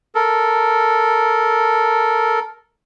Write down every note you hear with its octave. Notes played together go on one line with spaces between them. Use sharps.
A4 A#4